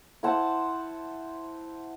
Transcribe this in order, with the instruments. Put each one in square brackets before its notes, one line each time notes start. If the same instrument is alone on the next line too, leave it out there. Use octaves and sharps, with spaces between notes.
[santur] E4 C5 F#5 A5